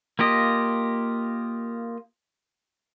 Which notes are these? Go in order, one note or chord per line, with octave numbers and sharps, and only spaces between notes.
A#3 F4 G4 D#5